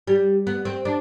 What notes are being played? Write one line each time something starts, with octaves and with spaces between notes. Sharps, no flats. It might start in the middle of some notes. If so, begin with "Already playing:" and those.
G3
B3
C4
D4